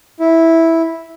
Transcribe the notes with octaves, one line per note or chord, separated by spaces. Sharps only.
E4